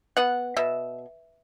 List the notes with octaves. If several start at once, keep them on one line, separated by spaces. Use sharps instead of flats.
B3 F#5
B2 E5